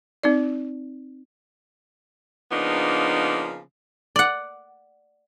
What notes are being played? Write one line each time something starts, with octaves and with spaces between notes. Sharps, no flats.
C4 D#4 D5
C#3 F3 A#3 B3 D4 D#4
D5 F#5